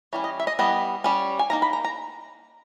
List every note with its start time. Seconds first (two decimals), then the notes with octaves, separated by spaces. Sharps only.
0.13 E3 G3 C#4 C#5
0.24 D#5
0.40 E5
0.47 D#5
0.59 E3 G3 B3 D#5
1.04 G3 C#4
1.39 G#5
1.50 D#3 A#3 D#4 A#5
1.62 B5
1.73 A#5
1.85 A#5